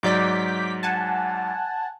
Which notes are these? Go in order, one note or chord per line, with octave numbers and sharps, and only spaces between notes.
G#2 F#3 D5 D6 G6 B6
F#5 G#5 A5